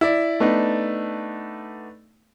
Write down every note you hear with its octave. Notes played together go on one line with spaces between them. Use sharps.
E4 D5
A3 B3 D4 D#4